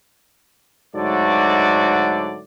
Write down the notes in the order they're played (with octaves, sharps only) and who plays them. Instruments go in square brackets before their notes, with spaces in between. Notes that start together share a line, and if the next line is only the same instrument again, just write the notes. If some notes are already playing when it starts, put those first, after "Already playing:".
[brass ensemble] G#2 D3 F#3 A3 F#4 D5